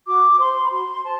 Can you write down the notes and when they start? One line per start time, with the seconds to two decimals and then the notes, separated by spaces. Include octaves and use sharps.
0.06 F#4 D6
0.39 C5 C6
0.64 B5
0.71 F#4 C6
1.04 C5 A5